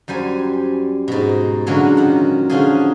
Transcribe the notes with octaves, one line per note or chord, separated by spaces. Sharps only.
F#2 G3 C5 G#5
G#2 B2
A#2 D3 E3 F#3 G#3 C#4
D#3 F#5
D3 F3 C#4 D#4 F4 G#4